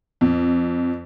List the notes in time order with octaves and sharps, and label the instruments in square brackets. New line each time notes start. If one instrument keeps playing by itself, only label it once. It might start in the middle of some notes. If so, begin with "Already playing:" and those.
[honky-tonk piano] F2